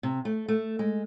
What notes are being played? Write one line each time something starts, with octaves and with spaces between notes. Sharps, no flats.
C3
A3
A3
G#3